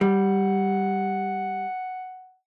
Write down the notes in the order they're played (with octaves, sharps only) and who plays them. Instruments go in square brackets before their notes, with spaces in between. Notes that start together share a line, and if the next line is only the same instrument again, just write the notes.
[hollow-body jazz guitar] G3 [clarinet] F#5